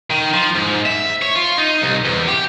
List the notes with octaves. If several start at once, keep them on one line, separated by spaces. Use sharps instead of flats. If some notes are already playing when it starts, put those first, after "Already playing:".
D#3
F3
G#2
E5
C#5
F4
D#4
C2
E2
G4